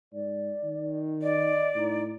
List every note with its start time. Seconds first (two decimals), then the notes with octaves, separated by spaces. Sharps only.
0.13 G#2 D5
0.64 D#3
1.22 D5 D#5
1.75 A2 D#4